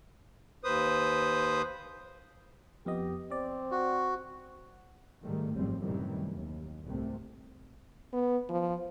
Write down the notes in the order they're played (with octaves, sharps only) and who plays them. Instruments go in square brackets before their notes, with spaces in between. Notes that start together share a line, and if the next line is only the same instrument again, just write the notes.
[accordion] D#2 B4 C5 D#6
[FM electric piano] F2 B3 D#5 [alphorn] G4
[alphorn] C4 [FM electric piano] D5
[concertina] F#4
[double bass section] G#2 D#3 G3 A3
G#1 F#2 A2 F3 G3 C4
F#2 A2 C3 D#3 E3 G3
D#2
C2 G#2 C3 A3
[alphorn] B3
F3